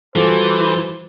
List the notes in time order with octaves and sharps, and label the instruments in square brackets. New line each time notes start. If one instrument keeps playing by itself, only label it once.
[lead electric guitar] E3 [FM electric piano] G3 D6 A6 [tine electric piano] F4 F#4 A4 [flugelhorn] C5